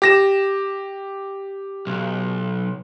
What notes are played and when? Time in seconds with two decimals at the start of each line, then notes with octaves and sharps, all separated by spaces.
0.02 G4 A#6 E7
1.87 B1